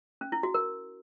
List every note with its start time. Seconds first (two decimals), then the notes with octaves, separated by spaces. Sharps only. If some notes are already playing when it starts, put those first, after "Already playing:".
0.21 C#4
0.32 E4
0.43 F#4
0.54 A#4